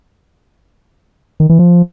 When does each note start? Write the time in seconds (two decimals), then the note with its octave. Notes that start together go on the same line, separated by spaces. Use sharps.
1.40 D#3
1.49 E3
1.59 F3